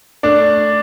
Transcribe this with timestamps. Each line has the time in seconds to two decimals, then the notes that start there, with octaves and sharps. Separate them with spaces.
0.23 A3 D4 D5